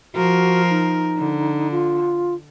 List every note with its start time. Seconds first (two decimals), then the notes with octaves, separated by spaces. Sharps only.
0.15 F3 F#4 A#4
0.70 D#4
1.18 D3
1.71 F4